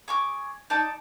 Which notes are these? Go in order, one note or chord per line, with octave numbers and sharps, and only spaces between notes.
G#4 C#6 D6
D#4 D5 A5